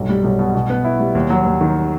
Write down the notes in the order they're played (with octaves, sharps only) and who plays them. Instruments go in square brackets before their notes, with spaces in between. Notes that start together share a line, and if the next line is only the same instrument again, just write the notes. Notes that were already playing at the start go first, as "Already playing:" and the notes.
Already playing: [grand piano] B1 G2
G3
B1
B2
B2
B3
E4
G3
D#2
F#3
D#2
D#3